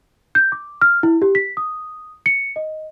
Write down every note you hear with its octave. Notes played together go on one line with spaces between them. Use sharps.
G6
D6
F6
E4
G4
B6
D#6
C#7
D#5